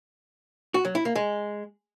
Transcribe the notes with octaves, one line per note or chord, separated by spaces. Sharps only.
F#4
F#3
E4
A#3
G#3